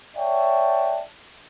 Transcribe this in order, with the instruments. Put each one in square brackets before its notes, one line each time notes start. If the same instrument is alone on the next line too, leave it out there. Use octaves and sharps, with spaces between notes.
[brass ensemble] C#5 D5 E5 F#5 G5 A5